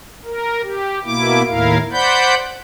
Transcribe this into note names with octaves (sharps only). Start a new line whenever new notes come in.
A#4
G4
B2 A#3 E4 D6
D#2 A2 E4 A#4 F5
C5 D5 F#5 B5 G6